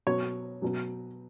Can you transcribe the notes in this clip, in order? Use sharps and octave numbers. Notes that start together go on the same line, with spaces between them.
B2 F#3 C#5
B2 F#3